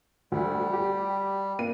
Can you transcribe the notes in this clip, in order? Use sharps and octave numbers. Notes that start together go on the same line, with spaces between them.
D2 G3
G4
A#3 D#7